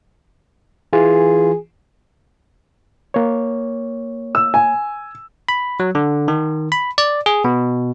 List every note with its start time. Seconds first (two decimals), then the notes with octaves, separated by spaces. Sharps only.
0.93 E3 F4 G#4
3.14 A#3 C#5
4.35 E6
4.54 G#5
5.49 B5
5.80 F#3
5.95 D3
6.28 D#3
6.72 B5
6.98 D5
7.26 G#4
7.44 B2